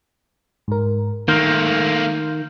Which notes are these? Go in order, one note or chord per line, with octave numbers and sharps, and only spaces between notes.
G#2 A#4
D#3 A3 A#3 C6 F6 G6